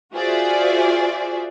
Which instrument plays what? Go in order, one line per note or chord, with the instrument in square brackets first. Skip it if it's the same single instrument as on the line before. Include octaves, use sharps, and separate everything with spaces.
[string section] F4 F#4 G#4 C5 D5 E5